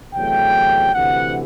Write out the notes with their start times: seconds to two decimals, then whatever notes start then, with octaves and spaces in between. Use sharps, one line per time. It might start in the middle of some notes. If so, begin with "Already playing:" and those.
0.14 E2 C3 F#3 A3 G5
0.94 D2 C3 E3 F#5